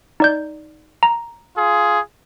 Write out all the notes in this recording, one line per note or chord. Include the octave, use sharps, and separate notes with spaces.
D#4 D5 G6
A#5
F4 G#4